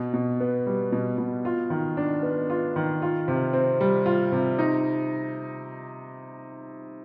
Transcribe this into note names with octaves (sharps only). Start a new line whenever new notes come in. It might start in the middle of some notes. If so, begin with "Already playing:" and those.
Already playing: B2
B2
B3
G3
B2
B2
F4
D#3
D4
B3
F4
D#3
F4
C3
C4
G3
F4
C3
D#4